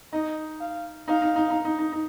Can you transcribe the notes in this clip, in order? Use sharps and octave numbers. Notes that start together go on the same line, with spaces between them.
D#4 D#5
F5
D#4 F5
D#4
D#4
D#4
D#4
D#4
D#4